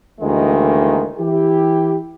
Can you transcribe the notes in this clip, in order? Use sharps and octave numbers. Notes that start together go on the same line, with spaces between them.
D2 D#3 E3 G#3 A#3
E3 E4 G4